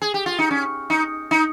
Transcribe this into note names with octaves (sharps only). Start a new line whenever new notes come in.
G#4
G4
F4
D#4
C#4
D#4
D#4